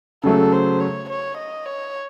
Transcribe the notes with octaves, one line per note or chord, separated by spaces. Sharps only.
C#3 F#3 A3 A4
C5
C#5
C#5
D#5
C#5